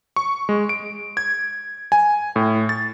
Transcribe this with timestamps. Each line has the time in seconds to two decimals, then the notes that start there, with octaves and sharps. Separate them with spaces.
0.16 C#6
0.49 G#3
0.69 D7
1.17 G#6
1.92 G#5
2.36 A2
2.69 A6